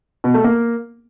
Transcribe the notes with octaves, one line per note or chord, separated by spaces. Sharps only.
B2
A3
A#3